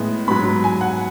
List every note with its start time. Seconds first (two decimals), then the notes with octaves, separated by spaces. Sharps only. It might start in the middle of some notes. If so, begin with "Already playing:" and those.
Already playing: A2 G#3 B3
0.28 G#2 F#3 B3 B5
0.64 G#5
0.81 F#5